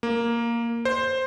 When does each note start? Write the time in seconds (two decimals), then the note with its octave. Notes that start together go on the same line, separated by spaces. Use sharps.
0.03 A#3
0.85 C5